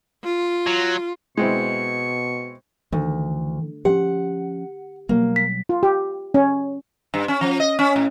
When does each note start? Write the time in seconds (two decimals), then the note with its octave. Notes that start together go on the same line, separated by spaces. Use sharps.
0.24 F4
0.67 F#3
1.37 B2 G#3 C4 E4 C#6
2.92 D2 D#3 E3
3.85 F3 C#4 G4 F#5
5.09 B2 F#3 G3 A#3
5.36 B6
5.69 F4
5.83 G4
6.34 C#4
7.14 G2
7.28 C#4
7.41 F3
7.60 D#5
7.79 C#4
7.96 A2